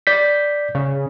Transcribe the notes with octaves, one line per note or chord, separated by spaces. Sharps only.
D5 G6 B6
C#3